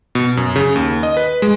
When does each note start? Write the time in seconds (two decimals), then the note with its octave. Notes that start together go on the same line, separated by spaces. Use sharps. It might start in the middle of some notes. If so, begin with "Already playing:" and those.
0.15 B2
0.37 F#2
0.56 C#3
0.76 D#2
1.03 D#5
1.17 B4
1.42 G#3